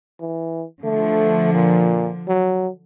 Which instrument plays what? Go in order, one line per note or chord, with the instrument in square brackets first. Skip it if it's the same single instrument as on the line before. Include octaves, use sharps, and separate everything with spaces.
[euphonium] E3
[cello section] D3 F3 [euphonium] A3
[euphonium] A#2
F#3